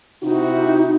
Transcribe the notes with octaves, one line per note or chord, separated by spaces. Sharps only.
C3 D#4 E4 F#4